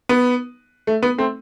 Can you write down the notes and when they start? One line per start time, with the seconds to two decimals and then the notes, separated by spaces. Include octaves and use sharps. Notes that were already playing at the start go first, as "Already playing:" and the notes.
0.09 B3
0.87 A3
1.03 B3
1.18 A3 C4